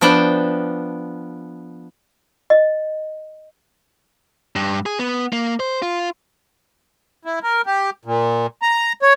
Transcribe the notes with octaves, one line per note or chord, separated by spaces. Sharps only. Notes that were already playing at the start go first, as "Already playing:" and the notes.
F3 B3 D4 G5
D#5
G2
G#4
B3
A#3
C5
F4
E4
A#4
G4
A#2
A#5
C#5